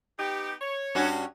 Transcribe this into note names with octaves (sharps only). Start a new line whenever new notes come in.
B3 D#4 G4
C#5
G2 C#4 F#4